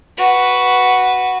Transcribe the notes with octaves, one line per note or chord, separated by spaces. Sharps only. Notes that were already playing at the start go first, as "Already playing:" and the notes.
F#4 B4